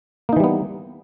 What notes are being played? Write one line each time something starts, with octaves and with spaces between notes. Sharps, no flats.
E3 G3 A#3 B3 D#4